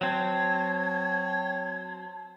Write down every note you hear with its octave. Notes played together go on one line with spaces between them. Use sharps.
F#3 C4 C#5 A5 G#6